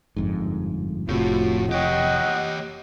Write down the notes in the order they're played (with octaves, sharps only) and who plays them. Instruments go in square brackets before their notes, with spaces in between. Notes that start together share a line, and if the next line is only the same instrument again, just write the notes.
[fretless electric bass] G1 F2 G#2
[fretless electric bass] F1 C3 [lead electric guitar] A2 [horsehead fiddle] F4 F#4
[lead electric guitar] G4 C#5 [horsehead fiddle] D#5 [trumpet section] F#5 G5